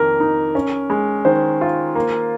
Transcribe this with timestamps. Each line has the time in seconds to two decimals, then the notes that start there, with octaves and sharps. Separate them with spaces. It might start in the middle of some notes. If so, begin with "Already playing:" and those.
Already playing: F2 D#3 A#3 A#4
0.20 D#4
0.55 C#4
0.90 G#3
1.25 D#3 C5
1.61 F4
1.95 A#3